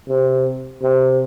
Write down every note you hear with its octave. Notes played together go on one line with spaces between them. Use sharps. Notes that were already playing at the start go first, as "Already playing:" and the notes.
C3
C3